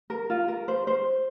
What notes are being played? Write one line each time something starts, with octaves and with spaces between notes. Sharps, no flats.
A#4
F4
A#4
C5
C5